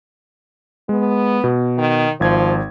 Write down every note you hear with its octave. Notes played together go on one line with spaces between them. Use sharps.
G#3 B3
B2
D#3
G#1 F3 G#6